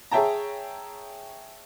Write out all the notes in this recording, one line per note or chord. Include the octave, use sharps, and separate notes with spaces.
G#4 C#5 E5 G5 A5 A#5